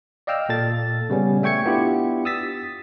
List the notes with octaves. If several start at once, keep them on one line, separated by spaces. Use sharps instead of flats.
D5 D#5 F5 G5 E6 F6
A#2 A4 A5 A6
C#3 G3 B3 C#4
A3 E5 G5 C#6 G#6 C#7
B3 D4 E4 F4 G4
D#6 E6 A6 B6